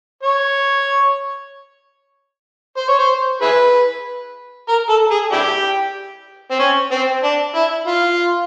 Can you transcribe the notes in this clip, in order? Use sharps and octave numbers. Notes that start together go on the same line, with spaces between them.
C#5
C5
C#5
C5
E4 G#4 B4
A#4
A4
G#4
D4 E4 G4
C4
C#4
C4
D4
E4
F4